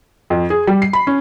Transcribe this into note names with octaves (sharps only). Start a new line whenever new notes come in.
F2
G#4
G3
C7
B5
C#4